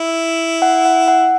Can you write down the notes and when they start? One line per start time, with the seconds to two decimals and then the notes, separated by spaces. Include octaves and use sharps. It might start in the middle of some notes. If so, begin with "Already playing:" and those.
Already playing: E4
0.62 F#5
0.85 F#5
1.08 F#5